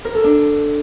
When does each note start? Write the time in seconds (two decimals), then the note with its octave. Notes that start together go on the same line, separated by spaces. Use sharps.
0.05 A#4
0.14 A4
0.24 D4